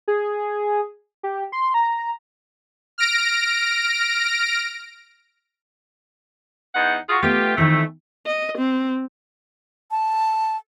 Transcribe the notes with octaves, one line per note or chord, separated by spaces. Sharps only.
G#4
G4
C6
A#5
F6 A#6 D7
E2 D#4 F#5
F4 F#4 G#4
A3 B3 F4 G4
F2 D#3 E3 A3
D#5
C4
A5